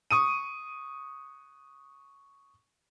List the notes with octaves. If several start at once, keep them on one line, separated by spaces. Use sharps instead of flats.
C#6 D#6 D#7